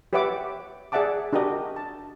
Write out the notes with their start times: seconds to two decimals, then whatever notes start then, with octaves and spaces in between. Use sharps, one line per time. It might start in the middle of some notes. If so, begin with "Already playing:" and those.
0.13 G4 B4 C#5 E5 F#5 D6
0.92 G#4 D5 E5 F#5 A5 D6
1.33 D4 F#4 G4 A#4 D#5
1.76 A5